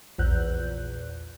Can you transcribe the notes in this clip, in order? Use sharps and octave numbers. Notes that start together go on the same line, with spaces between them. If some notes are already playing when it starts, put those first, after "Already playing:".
A#1 E2 F#6 G6